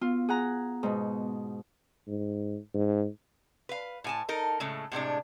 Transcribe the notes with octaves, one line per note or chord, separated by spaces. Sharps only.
B3 F4
G#4 F#5 A#5
G#2 B2
G#2
G#2
B4 F5
A2 G#5 A5
D#4 A4 A#4
A2 C#3 G#3 A3
A2 C3 G#3 D4